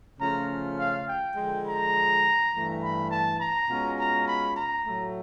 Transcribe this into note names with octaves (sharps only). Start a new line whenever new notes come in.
C#3 F3 A3 C#4 F4 A#5
F5
G5
D3 F3 G#3
A#5
G2 E3 A3
B5
A5
A#5
B2 G#3 C#4 F4
A#5
B5
A#5
A2 F#3 A3